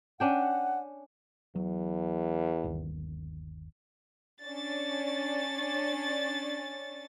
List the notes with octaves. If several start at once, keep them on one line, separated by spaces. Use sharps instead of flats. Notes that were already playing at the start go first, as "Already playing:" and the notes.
C#4 D4 F#5 G5
E2 F#3
G1 D#2 D#3
C#4 D4 A6